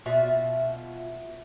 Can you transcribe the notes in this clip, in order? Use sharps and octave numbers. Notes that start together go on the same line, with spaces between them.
B2 F4 F#4 E5